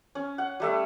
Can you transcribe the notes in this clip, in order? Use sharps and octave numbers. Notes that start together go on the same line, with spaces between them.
C#4
F#5
G3 A3 E5